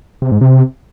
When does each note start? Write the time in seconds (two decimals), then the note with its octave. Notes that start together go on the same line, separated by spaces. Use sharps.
0.22 C3
0.32 G#2
0.41 C3